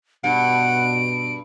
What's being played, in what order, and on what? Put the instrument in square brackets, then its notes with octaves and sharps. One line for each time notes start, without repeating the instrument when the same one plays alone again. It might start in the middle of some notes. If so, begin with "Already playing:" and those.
[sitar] G2 [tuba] B2 [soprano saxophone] F#5 [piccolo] D7